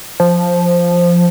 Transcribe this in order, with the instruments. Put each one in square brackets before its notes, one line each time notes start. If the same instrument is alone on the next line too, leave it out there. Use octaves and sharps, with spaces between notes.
[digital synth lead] F3